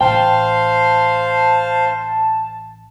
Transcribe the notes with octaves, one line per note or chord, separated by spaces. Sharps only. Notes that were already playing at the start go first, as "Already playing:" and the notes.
A1 C5 F5 G5 A5